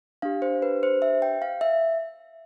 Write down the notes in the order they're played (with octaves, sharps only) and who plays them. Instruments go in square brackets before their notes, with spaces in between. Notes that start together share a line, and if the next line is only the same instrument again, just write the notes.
[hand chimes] D4 G4 F5
C5
B4
C5
E5
G5
F5
E5